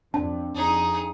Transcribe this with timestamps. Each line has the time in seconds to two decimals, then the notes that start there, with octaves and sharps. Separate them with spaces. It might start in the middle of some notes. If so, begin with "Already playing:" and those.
0.14 F2 C4 D4 A5
0.55 F2 D#4 G#4